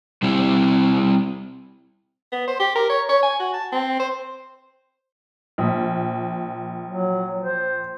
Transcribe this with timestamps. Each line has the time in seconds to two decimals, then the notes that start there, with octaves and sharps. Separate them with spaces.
0.23 G3 C4 E4
2.32 B3
2.47 C5
2.60 G4
2.76 A#4
2.90 C#5
3.09 C#5
3.23 G#5
3.40 F#4
3.54 A5
3.73 C4
4.00 C5
5.58 A#1
6.88 F#3
7.42 C5